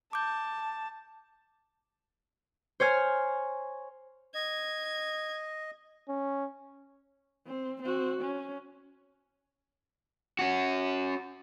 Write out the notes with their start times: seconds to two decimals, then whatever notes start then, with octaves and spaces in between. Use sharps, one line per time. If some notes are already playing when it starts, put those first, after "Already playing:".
0.13 A5 D6 G6
2.80 C5 C#5 G#5 F6
4.35 D#5 G#6
6.08 C#4
7.47 C4
7.82 C4 F#4
8.22 C#4
10.39 C#4 F#4